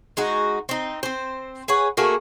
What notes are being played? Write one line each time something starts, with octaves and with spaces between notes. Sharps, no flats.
G#3 D#4 F#4
C4 D#4
C4 C5
G#4 B4 C#5 F#5
A3 A#3 F#4 G#4